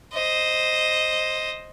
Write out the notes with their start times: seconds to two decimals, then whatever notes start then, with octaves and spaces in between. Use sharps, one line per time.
0.14 C5 D#5